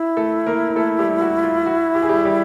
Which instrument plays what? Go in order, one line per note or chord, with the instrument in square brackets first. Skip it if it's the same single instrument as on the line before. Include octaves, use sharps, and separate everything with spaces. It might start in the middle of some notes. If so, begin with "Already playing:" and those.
Already playing: [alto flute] E4
[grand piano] A3 A4
A#3 A#4
A#4
A3 A4
G3 G4
F#4
F4
F#4
G4
G#4
G3 G4
G3 G4